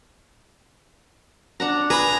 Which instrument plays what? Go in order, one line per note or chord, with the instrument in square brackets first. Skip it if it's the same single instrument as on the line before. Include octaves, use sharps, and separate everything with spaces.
[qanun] D4 F#5 A#5
[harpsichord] G#4 B5 D#6 [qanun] B4 [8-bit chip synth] A#5